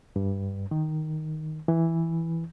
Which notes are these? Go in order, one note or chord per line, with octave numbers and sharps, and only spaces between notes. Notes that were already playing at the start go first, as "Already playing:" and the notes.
G2
D#3
E3